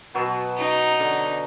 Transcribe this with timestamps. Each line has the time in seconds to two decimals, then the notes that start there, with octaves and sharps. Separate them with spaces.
0.14 B2 F#3 B3
0.58 D#4
1.00 D3